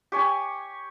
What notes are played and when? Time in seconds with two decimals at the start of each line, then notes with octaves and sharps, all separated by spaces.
0.12 G4 C#5 G#5